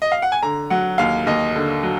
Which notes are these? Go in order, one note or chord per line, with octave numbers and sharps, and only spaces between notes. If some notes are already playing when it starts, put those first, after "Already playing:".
D#5
F5
F#5
G#5
D3 A#5
F#3 F#5
D#2 F5
D#2 D#5
D3
F#3